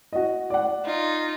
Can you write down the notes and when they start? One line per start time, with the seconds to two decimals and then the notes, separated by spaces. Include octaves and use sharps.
0.13 F#4 D#5
0.50 D5 F#5
0.84 D#4 F4